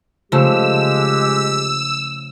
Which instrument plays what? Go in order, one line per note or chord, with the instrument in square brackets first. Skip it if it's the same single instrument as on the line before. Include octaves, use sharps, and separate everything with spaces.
[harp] C#3 A3 [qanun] F3 [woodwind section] G#3 G4 [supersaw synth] E6